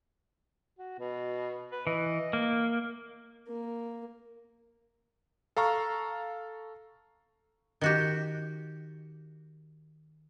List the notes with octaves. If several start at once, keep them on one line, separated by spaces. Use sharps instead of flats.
F#4
B2
B4
E3 D#5
A#3
A#3
A4 F5 A#5 C#6 F6
D#3 F#4 G4